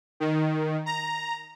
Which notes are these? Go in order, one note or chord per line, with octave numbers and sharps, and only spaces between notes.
D#3
A#5